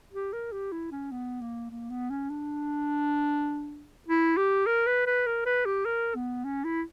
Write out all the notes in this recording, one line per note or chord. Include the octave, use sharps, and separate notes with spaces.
G4
A#4
G4
E4
C#4
B3
A#3
A#3
B3
C#4
D4
E4
G4
A#4
B4
B4
A#4
B4
G4
A#4
B3
C#4
E4